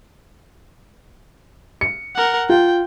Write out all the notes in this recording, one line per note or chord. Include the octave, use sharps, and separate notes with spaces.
C#7
A#4 F#5
F4 G5